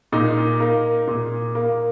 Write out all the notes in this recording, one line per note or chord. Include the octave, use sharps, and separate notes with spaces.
A#2 D#4
A#3
A#2
A#3